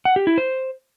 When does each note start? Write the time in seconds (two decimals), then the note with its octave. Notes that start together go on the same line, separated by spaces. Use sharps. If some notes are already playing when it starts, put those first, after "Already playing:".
0.05 F#5
0.16 G4
0.27 E4
0.38 C5